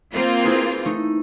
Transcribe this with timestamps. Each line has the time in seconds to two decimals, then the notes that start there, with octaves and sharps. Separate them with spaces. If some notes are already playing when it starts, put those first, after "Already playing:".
0.14 A#3 C4 F4
0.44 E4 G#4 B4
0.85 A3 D#4